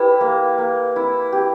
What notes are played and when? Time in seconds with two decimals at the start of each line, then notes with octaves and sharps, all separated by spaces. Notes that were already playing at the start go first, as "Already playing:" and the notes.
Already playing: E4 G4 B4
0.21 A#3
0.58 A#3
0.96 E4
1.33 G4